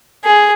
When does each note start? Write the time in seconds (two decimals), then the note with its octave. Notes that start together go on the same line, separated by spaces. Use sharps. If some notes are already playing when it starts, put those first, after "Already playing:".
0.25 G#4